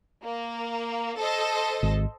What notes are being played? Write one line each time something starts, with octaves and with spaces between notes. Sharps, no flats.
A#3
A4 C5 D#5
G#1